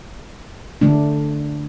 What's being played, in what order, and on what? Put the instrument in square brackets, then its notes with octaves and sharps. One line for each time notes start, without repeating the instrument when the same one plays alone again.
[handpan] D3 A3 D4